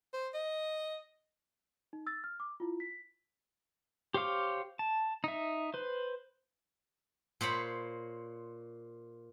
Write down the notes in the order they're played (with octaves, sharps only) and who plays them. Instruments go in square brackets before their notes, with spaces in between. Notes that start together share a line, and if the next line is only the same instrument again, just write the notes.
[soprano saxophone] C5
D#5
[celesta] D#4
E6 A6
F6
D6
E4 F4
B6
[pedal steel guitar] G4 C5 C#5 F5 D6
A5
D#4 E5
B4 C5
[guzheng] A#2 C5 C#5 B5